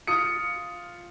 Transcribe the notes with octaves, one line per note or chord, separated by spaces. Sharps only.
F4 D#6 C#7